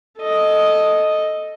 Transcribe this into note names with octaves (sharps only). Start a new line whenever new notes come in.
A4 D#5